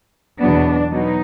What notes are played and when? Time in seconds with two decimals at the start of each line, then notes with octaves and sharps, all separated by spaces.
0.40 E2 B2 F#3 B3 D4
0.91 B2 F#3 B3 D#4